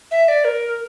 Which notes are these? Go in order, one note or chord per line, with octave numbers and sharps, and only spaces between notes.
E5
D5
A#4